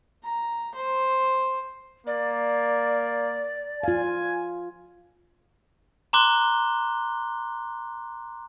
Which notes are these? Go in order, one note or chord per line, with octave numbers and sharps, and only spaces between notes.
A#5
C5
A#3 D5
F4 F5 G#5
A#5 C6 D6 F#6 G7